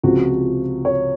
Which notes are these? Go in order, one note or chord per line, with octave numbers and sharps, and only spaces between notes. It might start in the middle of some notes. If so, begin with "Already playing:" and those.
C#2 C3 F3 F#4
C#5